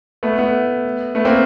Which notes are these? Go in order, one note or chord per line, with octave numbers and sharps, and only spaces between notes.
A3 B3
A3 B3
A3 B3
A#3 C4